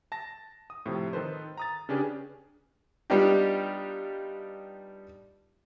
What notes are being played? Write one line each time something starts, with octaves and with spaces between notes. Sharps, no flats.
A5 A#6
D#6
A2 C3 F3
D#3 A4 B4 C5
A#5 D#6 A6
C#3 C#4 D4 G4 G#4 B4
G3 B3 D4 D#4 F4 G4